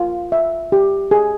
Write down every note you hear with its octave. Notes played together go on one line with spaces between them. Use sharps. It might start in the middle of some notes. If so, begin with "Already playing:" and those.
Already playing: F4
E5
G4
G#4